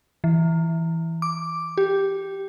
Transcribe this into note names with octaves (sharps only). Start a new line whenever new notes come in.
E3
D6
G4